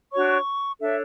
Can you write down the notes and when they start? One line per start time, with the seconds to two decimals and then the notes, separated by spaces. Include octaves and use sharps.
0.12 D4 F#4 C#5 C#6
0.80 D4 A4 C#5 E5